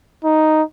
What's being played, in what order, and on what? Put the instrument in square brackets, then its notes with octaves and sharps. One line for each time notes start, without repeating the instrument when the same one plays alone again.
[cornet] D#4